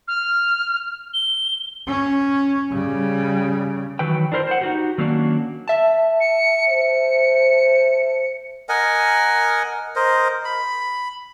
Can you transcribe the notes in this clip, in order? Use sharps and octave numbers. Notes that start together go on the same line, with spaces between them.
F6
G7
C#4
C#3 G3
D#3 E3 F#3 B4 G5
D4 E4 A#4 C5
C5 F#5
D#4 F#4 G4
D#3 F#3 A#3 C#4 D4 F#4
E5 A5
C#7
C5 C#7
A#4 D#5 F#5 G#5
A#4 C5 D#5
B5